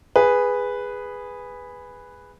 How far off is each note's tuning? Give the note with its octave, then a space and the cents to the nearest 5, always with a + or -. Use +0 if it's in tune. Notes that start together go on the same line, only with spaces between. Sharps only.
G#4 -10 B4 +0